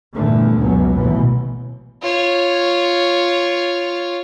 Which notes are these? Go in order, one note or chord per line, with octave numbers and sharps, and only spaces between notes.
E2 G2 A#2 D3 A3
C#2 F#2 B2 F#3 B3
A1 D#2 B2 E3
F4 C#5